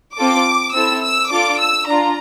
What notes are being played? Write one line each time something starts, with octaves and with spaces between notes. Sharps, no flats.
C4 F4 A4 D6
C4 E4 A4 E6
E6
D4 F4 A4 D6
E6
D4 F4 A#5